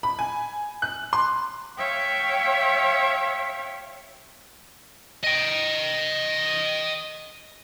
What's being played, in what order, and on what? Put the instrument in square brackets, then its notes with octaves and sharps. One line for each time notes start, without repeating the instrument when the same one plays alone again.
[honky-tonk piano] B5
G#5
F#6
C6
[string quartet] C#5 E5 F5 G5
[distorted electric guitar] D#5 G5